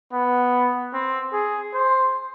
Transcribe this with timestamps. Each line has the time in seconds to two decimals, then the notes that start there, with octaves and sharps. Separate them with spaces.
0.13 B3
0.94 C4
1.33 G#4
1.74 C5